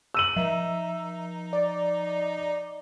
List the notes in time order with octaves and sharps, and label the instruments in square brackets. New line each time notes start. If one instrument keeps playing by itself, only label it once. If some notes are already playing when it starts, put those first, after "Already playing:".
[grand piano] E6 D#7 F#7
[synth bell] F3 [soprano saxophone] D#4 [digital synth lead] E5
[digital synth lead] D5